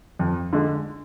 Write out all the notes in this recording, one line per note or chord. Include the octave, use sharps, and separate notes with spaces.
F2
D3 G#3